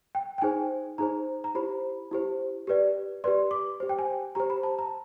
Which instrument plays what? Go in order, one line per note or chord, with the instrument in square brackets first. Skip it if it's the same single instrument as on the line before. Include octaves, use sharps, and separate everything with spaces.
[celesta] G5
G5
D#4 G#4 C5 G#5
D#4 G#4 C5 A#5
A#5
E4 G4 C5 B5
E4 G4 C5
G4 B4 D5
G4 B4 D5 C6
D6
G4 C5
G5
G#5
G4 C5 A#5
B5
A5
A#5